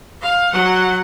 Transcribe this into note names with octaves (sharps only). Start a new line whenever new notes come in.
F5
F#3 F#5